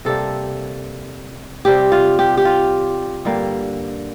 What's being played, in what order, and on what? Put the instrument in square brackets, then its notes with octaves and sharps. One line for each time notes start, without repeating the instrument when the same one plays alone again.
[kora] C3 G3 A#3 A4
C3 G3 C4 G4
F4
G4
G4
F4
G2 D3 G3 A#3